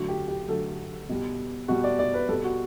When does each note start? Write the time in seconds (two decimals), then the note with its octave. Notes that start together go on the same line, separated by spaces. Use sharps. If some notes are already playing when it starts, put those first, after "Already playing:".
Already playing: D3 F#3 A3 F#4
0.09 G4
0.28 G4
0.48 D3 F#3 A3 A4
1.09 B2 G3
1.68 B2 G3 F#4
1.84 D5
1.99 D5
2.14 B4
2.29 B2 G3 A4
2.44 F#4